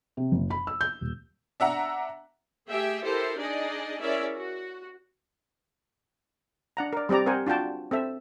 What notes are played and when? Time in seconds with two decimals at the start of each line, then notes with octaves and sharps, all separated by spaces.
0.17 C3
0.32 F#1
0.50 B5
0.67 E6
0.81 G6
1.01 D#1
1.60 D4 E5 F#5 A#5
2.69 A3 G4 G#4 E5 G5
3.04 E4 G4 A4 A#4 C5
3.38 D4 D#4 G#4 D5 D#5
4.01 C#4 E4 G#4 A#4 D5 E5
4.36 F#4
6.77 D4 F#5 A#5
6.93 A#4 D5
7.09 G3 C4 G4 D5 A#5
7.26 C4 A#4 C5 F#5 G#5
7.47 D4 F4 F#4 G5 A5
7.91 C4 A4 E5